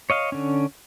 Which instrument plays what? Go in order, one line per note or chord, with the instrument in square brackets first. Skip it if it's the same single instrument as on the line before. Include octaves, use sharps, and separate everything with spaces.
[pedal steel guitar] C#5 D#5 F5
D3 C#4